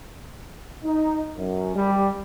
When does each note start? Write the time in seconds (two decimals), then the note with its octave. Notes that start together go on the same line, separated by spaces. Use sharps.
0.84 D#4
1.37 F#2
1.76 G3